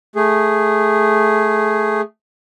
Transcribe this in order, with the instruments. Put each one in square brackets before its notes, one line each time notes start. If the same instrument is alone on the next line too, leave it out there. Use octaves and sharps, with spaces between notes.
[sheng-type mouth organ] A3 G#4